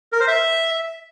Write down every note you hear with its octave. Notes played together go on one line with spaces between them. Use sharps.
A#4
C5
E5